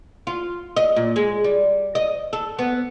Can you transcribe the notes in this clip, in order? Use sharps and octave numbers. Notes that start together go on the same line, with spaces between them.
F4
D#5
A#2
G#3
G3
D#5
A4
B3